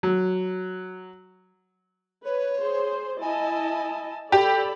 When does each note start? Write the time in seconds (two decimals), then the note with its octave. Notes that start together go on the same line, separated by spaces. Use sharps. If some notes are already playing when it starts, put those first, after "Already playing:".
0.03 F#3
2.25 B4 C#5
2.60 G#4 C5
3.22 E4 D#5 G#5 A5
4.32 G4 A4 D5 B5